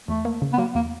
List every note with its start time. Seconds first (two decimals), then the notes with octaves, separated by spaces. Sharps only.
0.08 E2 A3
0.25 A#3
0.42 C#3
0.53 B3
0.58 F#3 A#3
0.75 E2 A#3